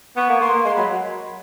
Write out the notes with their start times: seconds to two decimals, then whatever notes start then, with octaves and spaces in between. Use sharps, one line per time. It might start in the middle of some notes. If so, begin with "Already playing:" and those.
0.17 B3 C#6
0.29 A#3
0.41 A#3 C6
0.53 A#3
0.65 G#3 C6
0.76 F#3 B5